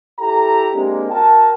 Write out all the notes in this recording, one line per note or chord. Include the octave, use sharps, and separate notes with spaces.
E4 G4 A4 A#5
G#3 A#3 C4 D4 G4
F#4 A#4 G5 A5